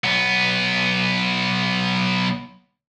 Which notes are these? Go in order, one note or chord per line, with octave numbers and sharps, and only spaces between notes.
B1 B3